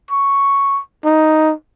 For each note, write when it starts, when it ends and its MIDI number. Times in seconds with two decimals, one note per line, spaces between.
0.11 0.80 85
1.05 1.53 63